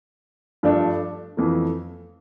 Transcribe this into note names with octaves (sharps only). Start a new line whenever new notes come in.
G2 F3 A3 D4
F2 E3 A3